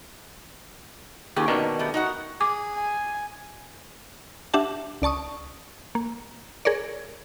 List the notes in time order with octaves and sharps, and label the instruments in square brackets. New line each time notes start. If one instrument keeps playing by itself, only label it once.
[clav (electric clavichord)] D#2 G4 [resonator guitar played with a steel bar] C#4 F4 G#4
[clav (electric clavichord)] B2 D#3 D4 [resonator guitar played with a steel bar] A#3 C#4
[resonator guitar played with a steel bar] A3 B3 G4
D#4 F#4 F#5
[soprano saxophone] G#4 [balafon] D6
[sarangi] G#5
[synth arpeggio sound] D4 G4 E5 F#5 A5
C#2 D5 A5 C#6 D#6
A#3
G#4 A#4 C#5 D5